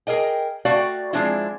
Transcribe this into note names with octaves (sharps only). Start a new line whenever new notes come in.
G#4 A#4 D#5 G5
A3 F#4 D5 F5 G5
F3 G#3 C4 D4 E4